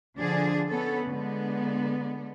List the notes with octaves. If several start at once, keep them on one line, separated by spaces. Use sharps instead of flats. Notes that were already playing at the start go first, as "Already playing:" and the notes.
D3 F3 D4 G#4
B3 C#4 A4 B4
D3 G#3 B3